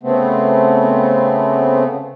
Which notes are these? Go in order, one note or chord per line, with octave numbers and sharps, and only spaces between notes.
C#3 A3 B3 C4